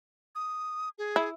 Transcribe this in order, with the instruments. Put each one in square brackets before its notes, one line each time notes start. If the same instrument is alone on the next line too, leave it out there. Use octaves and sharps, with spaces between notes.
[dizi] D#6
G#4
[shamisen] E4